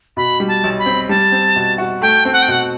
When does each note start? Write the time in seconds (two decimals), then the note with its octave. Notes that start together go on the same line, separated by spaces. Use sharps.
0.17 B2 B5
0.40 G3
0.48 A5
0.64 B1
0.79 B5
0.86 C4
1.09 G3 A5
1.32 C4
1.56 B2
1.78 F#4
2.02 A3 G5
2.25 C4
2.33 F#5
2.42 G5
2.48 B2 F#5